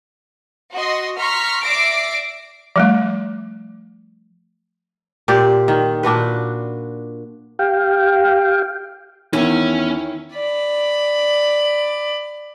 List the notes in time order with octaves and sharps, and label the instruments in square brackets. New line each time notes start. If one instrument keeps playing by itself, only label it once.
[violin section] F#4 D#5 C6
A#5 C6 C#6 F6 B6
D5 E5 D6 A#6 C7 D7
[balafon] F3 G3 A3
[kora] A#2 G4 C5 D5
D#3
A#2 D4 F#4 B4
[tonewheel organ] G4 F5 G5
[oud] E2 [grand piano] D#3 E4 [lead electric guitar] C#4
[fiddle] D5 B5